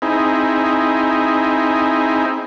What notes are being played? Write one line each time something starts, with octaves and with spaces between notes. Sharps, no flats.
C4 D#4 E4 G#4